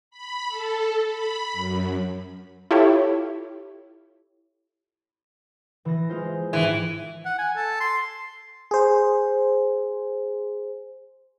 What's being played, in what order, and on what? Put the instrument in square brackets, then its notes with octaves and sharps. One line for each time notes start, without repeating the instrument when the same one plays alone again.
[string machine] B5
A4
B5
F#2
[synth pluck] E4 F4 G4 A4 C#5 E5
[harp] E3 A#6
G#3 F4 C5
[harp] G#1 [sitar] E3
[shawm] F#5
G#5
A4
C6
[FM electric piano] G#4 C5